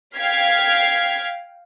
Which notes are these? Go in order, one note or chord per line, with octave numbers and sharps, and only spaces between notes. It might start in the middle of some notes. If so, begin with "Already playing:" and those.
F5 G5 F6 G#6 B6 C7